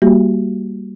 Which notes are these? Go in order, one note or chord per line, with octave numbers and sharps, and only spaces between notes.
G3 A#3 F#4 G4